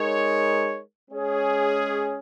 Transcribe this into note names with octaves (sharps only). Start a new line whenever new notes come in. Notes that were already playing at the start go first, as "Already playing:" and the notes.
Already playing: G#3 D#4 A#4 C#5
G#3 C#4 G#4 C#5